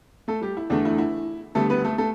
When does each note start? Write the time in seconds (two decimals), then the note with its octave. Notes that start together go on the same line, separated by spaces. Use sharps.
0.28 A3 A4
0.41 G3 G4
0.57 E4
0.70 E2 D3 A3 D4
0.85 E4
0.98 E4
1.55 D2 D3 G3 A3 B3 A4
1.70 B3 B4
1.85 A3 A4
1.98 A3 A4